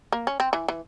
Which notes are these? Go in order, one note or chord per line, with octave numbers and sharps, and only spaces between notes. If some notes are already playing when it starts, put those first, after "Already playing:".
A#3
C#4
C4
E3
E3